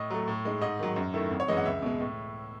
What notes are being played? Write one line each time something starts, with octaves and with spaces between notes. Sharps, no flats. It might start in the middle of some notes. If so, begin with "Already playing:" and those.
Already playing: A2 D#5
F#3 A3
A2
G#3 D#4
G#2 D#5
D#3 F#3
F#2
D#3 A3 E4
G#1
C#5
F#2 E3 G#3 D#5
F#5
C#2 E5
B2 G#3
A2